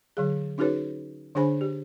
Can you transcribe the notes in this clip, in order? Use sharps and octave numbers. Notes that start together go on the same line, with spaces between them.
D3 F#3 G#4
C#4 D#4 F#4 G#4 B4 C#5
D3 D4 G#4 C5 G#5 B5
G4